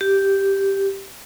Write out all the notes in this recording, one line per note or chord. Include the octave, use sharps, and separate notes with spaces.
G4